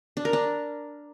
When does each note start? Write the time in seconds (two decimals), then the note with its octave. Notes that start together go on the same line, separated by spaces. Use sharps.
0.17 D4
0.25 A#4
0.33 D4